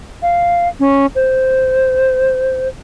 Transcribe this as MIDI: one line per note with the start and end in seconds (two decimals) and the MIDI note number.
0.22 0.68 77
0.80 1.06 61
1.15 2.68 72